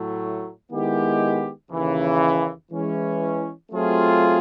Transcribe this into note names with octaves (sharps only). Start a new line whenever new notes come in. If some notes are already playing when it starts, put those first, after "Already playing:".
Already playing: A2 F#3 A3
D#3 G#3 B3 E4 G4
D#2 C#3 E3
E3 G#3 C#4
F#3 A3 C4 F4 G#4